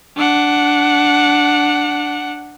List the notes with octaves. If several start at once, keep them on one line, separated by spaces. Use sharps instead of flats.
D4 F#5